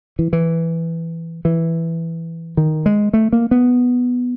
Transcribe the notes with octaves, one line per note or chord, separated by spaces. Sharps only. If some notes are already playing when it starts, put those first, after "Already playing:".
E3
E3
E3
D#3
G#3
A3
A#3
B3